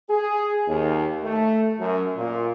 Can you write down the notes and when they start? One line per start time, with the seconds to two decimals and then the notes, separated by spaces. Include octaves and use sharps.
0.10 G#4
0.68 D#2
1.24 A3
1.80 F#2
2.17 A#2